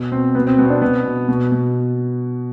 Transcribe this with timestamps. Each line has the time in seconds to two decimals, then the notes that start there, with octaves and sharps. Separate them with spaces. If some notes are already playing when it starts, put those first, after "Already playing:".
Already playing: B2
0.12 B2 C4
0.35 B2 B3
0.47 C4
0.58 B2 B3
0.66 C4
0.70 D4
0.82 B2 B3
1.05 B2
1.28 B2
1.52 B2